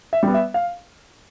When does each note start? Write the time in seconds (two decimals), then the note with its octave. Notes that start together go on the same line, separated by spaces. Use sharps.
0.13 E5
0.23 G3 B3
0.34 E5
0.54 F5